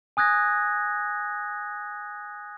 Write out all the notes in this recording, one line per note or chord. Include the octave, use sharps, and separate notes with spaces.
G#5 D#6 F#6 G#6 A#6